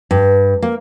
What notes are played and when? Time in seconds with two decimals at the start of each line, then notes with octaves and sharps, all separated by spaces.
0.11 G2
0.62 A#3